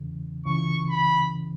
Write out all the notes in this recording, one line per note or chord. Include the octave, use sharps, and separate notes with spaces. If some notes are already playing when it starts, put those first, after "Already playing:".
Already playing: E2 C#3 E3
C#2 C#3 E3 C#6
B5